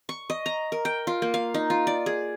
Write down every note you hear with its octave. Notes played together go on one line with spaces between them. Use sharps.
C#6
D#5
A#5
A#4
G5
F4
A#3
F5
D#4
F4
D5
G#4